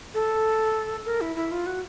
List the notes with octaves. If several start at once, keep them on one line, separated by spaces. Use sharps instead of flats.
A4
A#4
E4
E4
F4
F#4